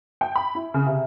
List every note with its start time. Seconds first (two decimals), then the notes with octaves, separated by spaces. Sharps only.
0.21 G5
0.36 B5
0.55 E4
0.74 C#3
0.86 C3